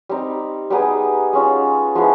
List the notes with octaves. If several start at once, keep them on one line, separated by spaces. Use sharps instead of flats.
G3 C4 D#4
G3 B3 D#4 G#4
G#3 C#4 F4
F3 G#3 B3 E4